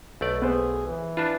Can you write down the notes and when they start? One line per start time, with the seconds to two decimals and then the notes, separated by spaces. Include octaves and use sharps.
0.21 B1 A3 D5
0.42 B3 G#4 B4 C5
0.87 E3
1.17 D4 E4 F4 B4 A5